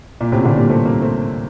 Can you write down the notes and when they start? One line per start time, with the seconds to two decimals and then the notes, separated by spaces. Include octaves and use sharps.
0.21 A#2
0.32 A2 C3
0.45 A#2 D3
0.57 G3 A#3
0.70 A3 C4
0.85 G3 A#3
1.02 A3 C4